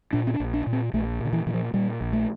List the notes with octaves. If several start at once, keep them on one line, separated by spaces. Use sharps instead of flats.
A#2 D4
C4
D4
A#1
D4
A#2
C4
A#1 A3
A#2
D3
E3
A#2 E3
F3
A#2 G3
A#1
A3